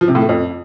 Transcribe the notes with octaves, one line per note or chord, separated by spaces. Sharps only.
F3
C3
A2
A3
F2